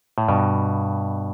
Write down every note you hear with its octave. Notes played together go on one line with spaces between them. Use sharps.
A2
G2 B2